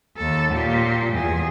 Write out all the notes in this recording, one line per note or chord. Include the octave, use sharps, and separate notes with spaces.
D#2 A4
A#2 G4
E2 G#4